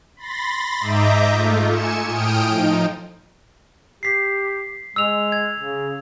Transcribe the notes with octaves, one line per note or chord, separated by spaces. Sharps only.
B5 C6 A6 A#6
G#2 D#5 E5 A#5 D6 G6
A3 F4
G#5 C#7 E7
A2 G5 D#6 F6 D7
F3 D#4
G4 B6 C7
G#3 E6 F7
G#6
C#3